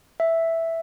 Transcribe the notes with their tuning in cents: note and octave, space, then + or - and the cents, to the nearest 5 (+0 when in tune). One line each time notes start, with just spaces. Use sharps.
E5 +0